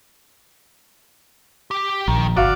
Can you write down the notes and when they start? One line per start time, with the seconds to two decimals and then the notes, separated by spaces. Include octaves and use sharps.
1.71 G4
2.08 A#1 D#3
2.37 G1 F#4 D5 F5